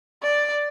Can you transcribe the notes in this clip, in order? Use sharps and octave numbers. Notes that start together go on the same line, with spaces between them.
D5